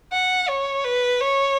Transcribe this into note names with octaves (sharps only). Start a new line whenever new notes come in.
F#5
C#5
B4
C#5